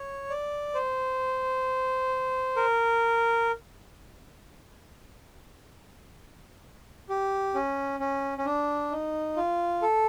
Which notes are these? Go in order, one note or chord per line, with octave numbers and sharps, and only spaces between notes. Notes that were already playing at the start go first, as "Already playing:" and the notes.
Already playing: C#5
D5
C5
A#4
G4
C#4
C#4
C#4
D4
D#4
F4
A4